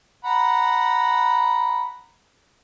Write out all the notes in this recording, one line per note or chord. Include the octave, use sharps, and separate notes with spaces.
F#5 A#5 B5